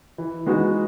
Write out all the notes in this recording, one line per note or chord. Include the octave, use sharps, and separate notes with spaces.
E3
G#3 B3 D#4 F#4